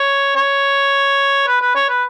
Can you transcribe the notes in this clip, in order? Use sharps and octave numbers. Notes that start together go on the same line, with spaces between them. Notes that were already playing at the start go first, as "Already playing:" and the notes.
Already playing: C#5
C#5
B4
B4
C#5
B4